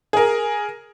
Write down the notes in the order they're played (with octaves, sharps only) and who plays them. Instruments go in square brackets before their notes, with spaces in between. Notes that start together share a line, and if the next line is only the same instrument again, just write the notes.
[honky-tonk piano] G#4 A#4